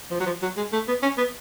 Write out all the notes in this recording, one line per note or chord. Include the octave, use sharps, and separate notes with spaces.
F3
F#3
F3
F#3
G#3
A3
B3
C#4
B3